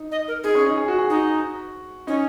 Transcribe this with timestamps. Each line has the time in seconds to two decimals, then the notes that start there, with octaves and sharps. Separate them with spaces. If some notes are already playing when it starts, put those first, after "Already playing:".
Already playing: D#4
0.11 D#5
0.28 A#4
0.44 D#4 G#4
0.55 C#4
0.66 D#4
0.77 G#4
0.88 F#4
0.98 G#4
1.09 D#4 F#4
2.07 C#4 D#4